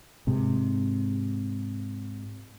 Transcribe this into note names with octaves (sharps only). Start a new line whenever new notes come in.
G#2 C3